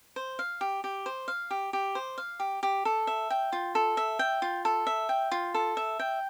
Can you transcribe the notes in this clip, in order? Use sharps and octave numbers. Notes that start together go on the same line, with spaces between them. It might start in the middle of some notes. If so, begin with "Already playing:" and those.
C5
F5
G4
G4
C5
F5
G4
G4
C5
F5
G4
G4
A4
E5
G5
F4
A4
E5
G5
F4
A4
E5
G5
F4
A4
E5
G5